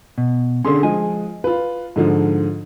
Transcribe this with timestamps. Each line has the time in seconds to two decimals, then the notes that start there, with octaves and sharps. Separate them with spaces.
0.18 B2
0.65 D3 C#4 G#4 A4 C6
0.83 F3 G#3 G#5
1.44 F4 B4
1.96 G#2 D3 F3